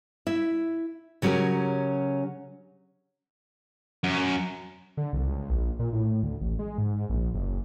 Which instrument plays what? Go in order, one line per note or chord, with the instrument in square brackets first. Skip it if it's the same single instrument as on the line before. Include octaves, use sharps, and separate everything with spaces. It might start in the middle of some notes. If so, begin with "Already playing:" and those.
[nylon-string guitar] E4 E5
C#3 F#3 C#4 G4 A#4
[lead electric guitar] F#2
[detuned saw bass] D3
C2
C#2
A#1
A#2
A2
D2
A1
G#3
G#2
A#1
F#1